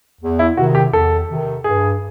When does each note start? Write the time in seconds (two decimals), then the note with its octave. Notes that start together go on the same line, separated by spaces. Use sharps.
0.21 E2
0.39 E4
0.57 C3 D#3 F#4
0.75 G4
0.93 E2 A4
1.29 C3 D#3
1.64 G2 G#4